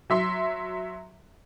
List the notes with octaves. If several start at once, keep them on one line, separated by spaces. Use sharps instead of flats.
F#3 E5 C6